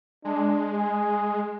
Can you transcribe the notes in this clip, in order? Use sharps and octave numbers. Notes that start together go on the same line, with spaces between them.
G#3 D4
G#4